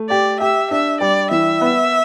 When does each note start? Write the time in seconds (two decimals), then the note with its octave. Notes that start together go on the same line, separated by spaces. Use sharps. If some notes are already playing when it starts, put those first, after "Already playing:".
Already playing: A3
0.09 G4 D5
0.40 G4 E5
0.71 D4 E5
1.01 G3 D5
1.31 E3 E5
1.61 B3